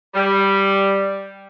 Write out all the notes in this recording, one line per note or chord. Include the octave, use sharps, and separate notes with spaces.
G3